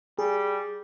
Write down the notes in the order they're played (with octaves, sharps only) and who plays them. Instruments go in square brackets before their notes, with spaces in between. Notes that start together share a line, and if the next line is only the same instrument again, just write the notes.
[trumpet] G3 [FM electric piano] G#4